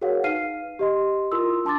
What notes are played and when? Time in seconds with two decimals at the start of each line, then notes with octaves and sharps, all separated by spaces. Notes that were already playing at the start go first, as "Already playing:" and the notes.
0.01 F#4 G#4 A#4 C#5 F5 F#5
0.24 D#4 B4 F5 F6 C7 D#7
0.79 G4 D#5 C6
1.31 E4 F4 A#4 C6 D#6 E6
1.65 D4 A5 C6 D6 A6